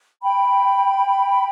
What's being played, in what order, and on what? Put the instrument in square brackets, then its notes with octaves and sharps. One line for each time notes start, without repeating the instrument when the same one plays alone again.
[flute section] G5 B5